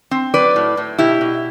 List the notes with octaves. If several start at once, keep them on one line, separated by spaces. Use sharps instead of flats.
C4
F#3 B4 D5
A2
A2
B2 E4 G4
B2